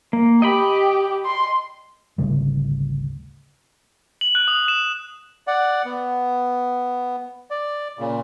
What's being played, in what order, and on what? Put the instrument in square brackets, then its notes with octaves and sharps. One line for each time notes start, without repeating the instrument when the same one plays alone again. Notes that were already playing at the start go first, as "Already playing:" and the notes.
[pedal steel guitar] A#3
[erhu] G4 [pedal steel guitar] D#5 G5 B5
[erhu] C6
[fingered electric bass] G#1 D2 C#3 G3
[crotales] F#7
F#6
D#6
E7
[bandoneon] D5 F#5
B3
D5
A#2 C#3